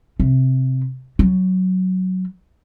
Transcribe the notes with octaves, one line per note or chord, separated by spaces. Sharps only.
C3
F#3